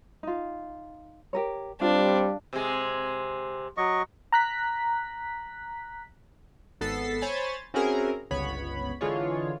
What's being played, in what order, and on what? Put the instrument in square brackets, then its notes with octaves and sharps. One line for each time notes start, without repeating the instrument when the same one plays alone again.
[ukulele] D#4 F4
G4 A#4 C#5
[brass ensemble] G3 [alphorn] C4 [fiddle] D4 [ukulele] F4
[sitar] C3 G#3
[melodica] F#3 D#5 C#6
[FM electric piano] A#5 F#6 B6
[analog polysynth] G#1 B3 A4 A6 B6 C7
C5 C#5 G#5 B5 A6
C4 C#4 E4 F#4 G#4 A#4
G1 C#2 B3 C#5 B5
D3 E3 G#3 F4 G#4 C#5